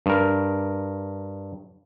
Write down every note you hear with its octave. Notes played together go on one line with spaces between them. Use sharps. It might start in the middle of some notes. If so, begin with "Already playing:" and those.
G2 A#4